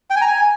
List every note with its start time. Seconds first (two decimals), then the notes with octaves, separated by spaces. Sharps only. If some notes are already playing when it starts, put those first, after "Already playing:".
0.10 G5
0.16 G#5
0.21 A#5
0.27 G#5